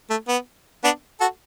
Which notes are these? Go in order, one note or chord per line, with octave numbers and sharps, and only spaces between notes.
A3
B3
B3 D4
F#4 A4